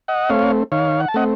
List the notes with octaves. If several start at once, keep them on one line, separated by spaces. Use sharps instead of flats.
D#5 F#5
A3 C4 C#5 F5
D#3 C#5 F5
F#5
A5
A3 C4 D#5 F#5